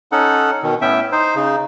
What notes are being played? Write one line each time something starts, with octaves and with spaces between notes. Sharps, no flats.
C#4 D#4 A4 F#5
B2 D#3
A2 B3 C#4 E5 G5
D#4 C5
C#3 D#4